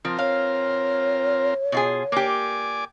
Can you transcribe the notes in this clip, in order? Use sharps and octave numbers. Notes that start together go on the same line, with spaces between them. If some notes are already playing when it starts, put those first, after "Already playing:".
F3 C4 F4 A#4
C#5 F5
B2 F4 G#4
A#3 G4 D5 G#5 D6